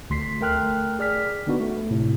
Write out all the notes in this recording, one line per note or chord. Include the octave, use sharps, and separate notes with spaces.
D2 C6 B6 C7
A3 A#4 G5 F6 F#6
G#4 D5 F6 B6
D3 B3 D4 D#4 F#4 B4
A3
A2 C3